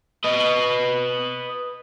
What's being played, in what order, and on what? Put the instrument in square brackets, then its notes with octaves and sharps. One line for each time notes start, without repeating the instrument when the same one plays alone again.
[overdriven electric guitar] B4 D#5